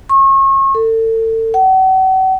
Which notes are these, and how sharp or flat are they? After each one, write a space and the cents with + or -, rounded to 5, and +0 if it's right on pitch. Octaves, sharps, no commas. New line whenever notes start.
C#6 -35
A4 +35
F#5 +40